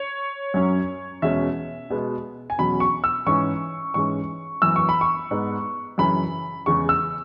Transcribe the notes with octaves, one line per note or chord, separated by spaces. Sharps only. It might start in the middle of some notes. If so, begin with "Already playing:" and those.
Already playing: C#5
F#2 F#3 C#4
E2 B2 G#3 C#4 E5
B2 G#3 B3
G#5
E2 B2 F#3 C#4 B5
C#6
E6
G#2 E3 C#4 C#6
G#2 E3 G#3 C#4 C#6
F#2 E3 B3 E6
C#6
B5
C#6
G#2 G#3 B3
F#2 C#3 E3 C#4 B5
E2 C#3 G#3 C#6
E6